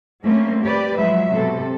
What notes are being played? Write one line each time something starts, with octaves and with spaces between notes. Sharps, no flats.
G3 A3 A#3 C4 C#4
G4 B4 D5
F3 F#3 G#3 E5
C3 A4